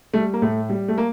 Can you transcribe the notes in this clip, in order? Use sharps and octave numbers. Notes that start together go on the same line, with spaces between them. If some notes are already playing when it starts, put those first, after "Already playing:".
G3 A3
A#3
A2 A3
G3
A3
A#3